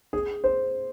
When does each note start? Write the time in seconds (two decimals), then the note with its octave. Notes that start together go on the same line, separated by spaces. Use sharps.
0.13 G#4
0.44 C5